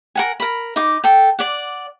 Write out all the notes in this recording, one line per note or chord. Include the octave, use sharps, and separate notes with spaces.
A#4 F#5 G#5
A#4 B5
D#4 D6
A4 G5
D5 F#5